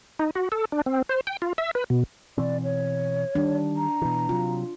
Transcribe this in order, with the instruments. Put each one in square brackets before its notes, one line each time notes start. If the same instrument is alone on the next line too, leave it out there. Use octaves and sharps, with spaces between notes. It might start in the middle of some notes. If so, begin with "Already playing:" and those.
[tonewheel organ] D#4
F#4
A4
D4
C4
C5
G5
F4
E5
B4
B2
[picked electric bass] B2 E3 C4 [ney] D5
[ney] C#5
[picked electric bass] D#3 G3 [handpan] D4
[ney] A#5
[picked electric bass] B2 E3
[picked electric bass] C3 F#3 [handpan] F4